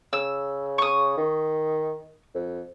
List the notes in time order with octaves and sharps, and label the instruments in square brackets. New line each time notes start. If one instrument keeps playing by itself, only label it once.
[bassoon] C#3 [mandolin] E6
[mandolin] C#6 D#6
[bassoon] D#3
F2